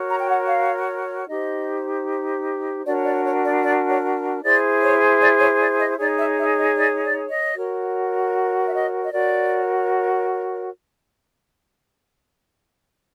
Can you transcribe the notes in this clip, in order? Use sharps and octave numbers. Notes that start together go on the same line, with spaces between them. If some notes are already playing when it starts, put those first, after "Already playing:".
Already playing: F#4 A#4 C#5
A#5
G5
F#5
F5
D#4 G4 C5 D#5
D4 F#4 A#4 C#5 D5
D5
C#5
D5
D5
C#5
E4 G#4 C5 D5
C#5
D5
C#5
D5
D#5
D#4 G#4 C#5 D5
E5
E5
D#5
D5
D5
D#5
F#4 A#4 C#5
E5
D#5
D#5
F#4 A#4 C#5 D5